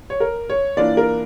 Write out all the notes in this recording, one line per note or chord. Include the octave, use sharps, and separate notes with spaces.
C#5
A#4
C#5
E3 A#3 D4 F4 D5
A#4